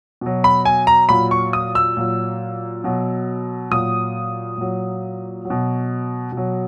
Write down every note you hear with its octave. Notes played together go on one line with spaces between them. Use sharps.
B2 F#3
B5
G#5
A#5
A#2 F#3 B5
C#6
D#6
E6
A#2 F#3
B2 F#3
A#2 F#3 D#6
A#2 F#3
F#3
B2
B2
F#3